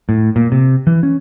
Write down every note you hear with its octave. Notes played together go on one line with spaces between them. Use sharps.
A2
A#2
C3
E3
C#4